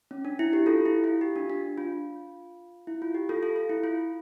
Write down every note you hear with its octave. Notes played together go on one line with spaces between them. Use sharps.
C#4
D4
E4
G4
F4 A4
E4
F4
G4
D4
D4
F4
E4
F4
G4
F4 A4
F4 A4
F4
E4
F4